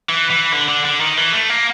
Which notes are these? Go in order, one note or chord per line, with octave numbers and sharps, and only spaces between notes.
E3
E3
D3
D3
D3
D#3
E3
A3
A#3